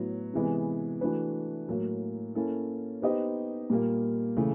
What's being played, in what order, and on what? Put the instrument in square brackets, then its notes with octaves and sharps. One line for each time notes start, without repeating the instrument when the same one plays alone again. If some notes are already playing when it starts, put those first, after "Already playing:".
Already playing: [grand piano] A2 F#3 B3 E4
C3 E3 G#3 B3
E3 A3 D4 F#4 B4
A2 F#3 A#3
A#3 C#4 E4 A4
B3 D#4 G4 C5 D#5
A#2 G3 A#3
C#3 E3 A3